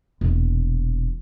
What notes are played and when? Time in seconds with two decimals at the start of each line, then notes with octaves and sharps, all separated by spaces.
0.21 E1 A#2